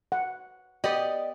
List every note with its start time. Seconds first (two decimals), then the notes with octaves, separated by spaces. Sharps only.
0.12 F#5
0.84 B3 G4 D5 D#5